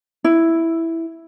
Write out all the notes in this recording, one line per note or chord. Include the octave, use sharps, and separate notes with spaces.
E4